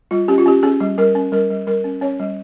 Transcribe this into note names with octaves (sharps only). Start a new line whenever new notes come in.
G3 F4
C#4 G4
F4
C#4 G4
C#4 G#4
G3
G3 A#4
C#4
G3 A#4
G3
G3 A#4
C#4
C#4 C#5
G3